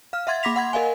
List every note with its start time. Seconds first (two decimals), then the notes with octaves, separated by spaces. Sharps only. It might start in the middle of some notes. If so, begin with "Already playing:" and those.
0.13 F5 F6
0.27 E5 F#5 C6 G#6 A6
0.43 A#3 B5 D6 A#6 B6 F7
0.56 F#5 C6 G#6
0.73 A#4 D#5 F5 G#5